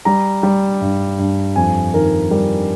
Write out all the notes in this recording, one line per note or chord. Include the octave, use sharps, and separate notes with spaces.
G3 A#5
G3
G2
G2
F2 G#5
D#3 A#4
G3 A#4